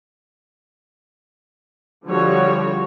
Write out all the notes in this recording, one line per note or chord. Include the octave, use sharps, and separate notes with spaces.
D3 F3 G3 F#4 C#5